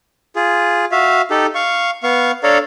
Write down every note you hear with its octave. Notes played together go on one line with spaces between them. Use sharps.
F4 G#4
F#4 E5 F5
D#4 G4 A4
F5 C#6
B3 F5 C#6
D4 A4 C#5 D5 F5 A#5